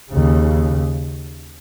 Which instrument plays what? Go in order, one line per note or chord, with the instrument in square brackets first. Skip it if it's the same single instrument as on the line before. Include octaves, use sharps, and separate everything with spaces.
[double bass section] D#2 C#3